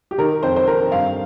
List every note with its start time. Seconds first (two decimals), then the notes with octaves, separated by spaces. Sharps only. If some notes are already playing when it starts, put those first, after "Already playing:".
0.11 G4
0.18 D#3 A#4
0.43 F2 C5
0.56 C5
0.67 C4 A#4
0.91 G2 F5